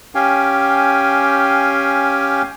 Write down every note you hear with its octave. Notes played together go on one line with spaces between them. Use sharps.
C#4 G4 F5 G5 G#5